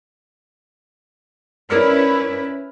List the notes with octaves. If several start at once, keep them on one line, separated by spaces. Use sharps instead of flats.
C#4 E4 A#4 B4 D5 F6